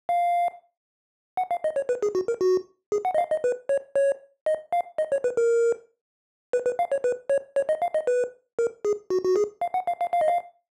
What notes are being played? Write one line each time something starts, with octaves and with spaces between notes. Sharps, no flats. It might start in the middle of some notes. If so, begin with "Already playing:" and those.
F5
F#5
F5
D#5
C#5
B4
G#4
F#4
A#4
F#4
G#4
F#5
D#5
F5
D#5
B4
C#5
C#5
D#5
F5
D#5
C#5
B4
A#4
B4
B4
F5
C#5
B4
C#5
C#5
D#5
F5
D#5
B4
A#4
G#4
F#4
F#4
G#4
F5
F#5
F5
F5
F5
D#5
F5